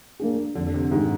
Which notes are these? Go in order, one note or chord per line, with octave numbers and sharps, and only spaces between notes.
A#3 D4 G#4
F2 D3
D3
C3
G#2 D#3 G#3 D#4 G4